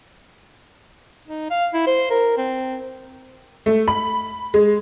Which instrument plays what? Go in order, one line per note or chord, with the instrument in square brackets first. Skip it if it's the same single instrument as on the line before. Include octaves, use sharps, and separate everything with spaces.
[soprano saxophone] D#4
F5
E4
C5
A#4
C4
[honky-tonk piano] A3
B5
G#3